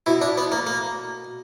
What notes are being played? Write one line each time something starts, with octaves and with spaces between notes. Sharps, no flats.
B2 E4
D4
B3
A#3
A#3